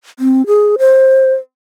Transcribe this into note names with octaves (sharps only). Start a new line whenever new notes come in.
C4
G#4
C5